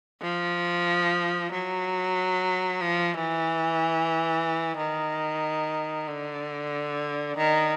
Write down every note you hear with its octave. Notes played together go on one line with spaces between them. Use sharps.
F3
F#3
F3
E3
D#3
D3
D#3